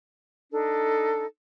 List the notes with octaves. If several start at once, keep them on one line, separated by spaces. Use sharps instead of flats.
D4 D#4 A4